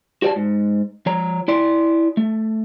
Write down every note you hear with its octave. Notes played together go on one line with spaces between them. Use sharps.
F#4 G4 C#5 D5 A5
G#2
F3 C#5 A#5
E4 D5 C6
A3